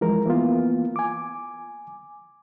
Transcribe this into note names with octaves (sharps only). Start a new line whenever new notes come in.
E3 F3 G#3 A#4
E3 A#3 B3 F4
G#5 D6